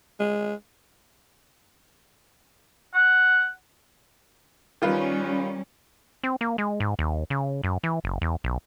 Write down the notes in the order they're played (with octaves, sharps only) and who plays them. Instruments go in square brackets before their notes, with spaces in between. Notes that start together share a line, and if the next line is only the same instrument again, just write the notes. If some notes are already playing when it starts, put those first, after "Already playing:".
[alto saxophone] G#3
[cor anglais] F#5
[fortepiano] D#3 F4 B4 [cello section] G3 C#4
[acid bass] C4
A#3
G#3
G#2
D#2
C#3
F#2
E3
F#1
E2
B1